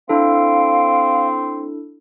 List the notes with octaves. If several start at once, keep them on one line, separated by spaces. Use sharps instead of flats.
C4 D4 E4 A4 F5